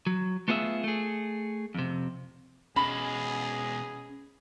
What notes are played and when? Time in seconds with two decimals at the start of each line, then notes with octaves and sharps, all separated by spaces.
0.07 F#3
0.48 A3 B3 F4 G#4 C#5 E5
0.84 A3 G#4
1.75 F2 C3
2.76 B2 G#3 C#4 G#4 B5